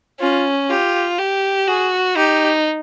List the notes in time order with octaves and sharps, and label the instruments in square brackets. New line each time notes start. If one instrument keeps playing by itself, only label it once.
[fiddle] C#4 [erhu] F4
[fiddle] F4 [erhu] G4
[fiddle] G4
[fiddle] F#4 [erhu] G#4
[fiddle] D#4 [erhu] G4